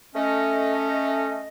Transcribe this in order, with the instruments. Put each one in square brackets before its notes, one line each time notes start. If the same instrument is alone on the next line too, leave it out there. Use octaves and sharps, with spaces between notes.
[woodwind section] A3 C#4 D#5